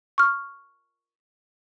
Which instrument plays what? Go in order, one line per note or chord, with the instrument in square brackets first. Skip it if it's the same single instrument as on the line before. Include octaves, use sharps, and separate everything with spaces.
[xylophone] C#6 F6